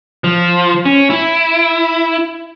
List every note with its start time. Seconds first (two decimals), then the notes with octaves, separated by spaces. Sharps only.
0.24 F3
0.86 C#4
1.10 E4